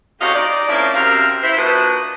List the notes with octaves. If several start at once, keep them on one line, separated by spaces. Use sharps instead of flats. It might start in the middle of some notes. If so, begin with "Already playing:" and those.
A2 C3 C#4 F#4 D#5 F5
D#4 D5
G#2 F3 A#3 C4 C#4 E4
F#2 C3 A#4 F5
E4 C5
A#2 D4 D#4 F#4 B4